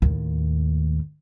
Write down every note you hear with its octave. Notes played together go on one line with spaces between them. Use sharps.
D#2 A2